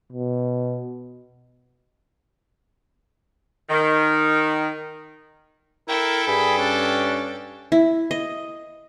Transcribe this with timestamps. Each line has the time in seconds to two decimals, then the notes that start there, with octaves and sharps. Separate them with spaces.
0.12 B2
3.69 D#3
5.88 E4 A4 A#4 G5
6.28 G2 G#4 B5
6.58 C#4 D4
7.72 E4
8.11 D#5